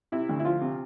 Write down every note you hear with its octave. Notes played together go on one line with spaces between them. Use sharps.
C3 E4
D2
E4
F3 F4
C3